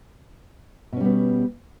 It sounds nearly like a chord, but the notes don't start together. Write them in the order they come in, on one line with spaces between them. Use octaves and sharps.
B2 C#4 G3 B3